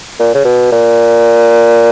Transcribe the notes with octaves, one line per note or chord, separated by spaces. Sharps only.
A#2
C#3
B2
A#2